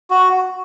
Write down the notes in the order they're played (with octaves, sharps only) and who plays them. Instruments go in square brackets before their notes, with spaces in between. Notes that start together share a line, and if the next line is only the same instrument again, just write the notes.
[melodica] F#4